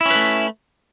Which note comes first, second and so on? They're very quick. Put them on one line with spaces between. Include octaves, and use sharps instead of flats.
E4 C#4 B4 A3